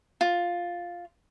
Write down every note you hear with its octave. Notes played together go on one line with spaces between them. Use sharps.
F4